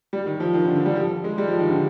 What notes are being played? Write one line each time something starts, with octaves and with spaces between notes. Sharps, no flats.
G3
D#3
F3
D#3
D3
D3
G3
F3
G#3
G3
F3
D#3
D3